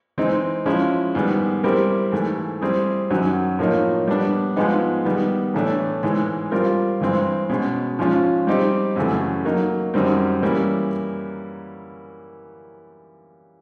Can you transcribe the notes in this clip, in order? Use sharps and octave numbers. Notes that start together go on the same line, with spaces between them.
E3 G#3 C4 D#4
F3 G#3 C#4 E4
G#2 D#3 G3 B3
G3 C4 E4 G4 A#4
G#2 E3 A3
G3 C4 E4 G#4
F#2 D#3 F#3
A2 F3 A#3 D#4
G3 B3 D4
G#2 F3 G#3 B3 D#4
D#3 G3 B3
A2 E3 A3 D4
G#2 E3 G#3
G3 C4 F4 A#4
G2 E3 G#3 C4
B2 G#3 C#4
G#2 F3 G#3 C#4 F4
G3 C4 D#4 G4
F#2 C#3 E3 A3
F#3 A#3 D#4
F#2 D#3 G3 C4
E3 G3 A#3 C#4 E4